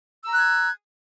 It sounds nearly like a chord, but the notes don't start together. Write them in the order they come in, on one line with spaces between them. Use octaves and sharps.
E6 A#5 F#6 G#6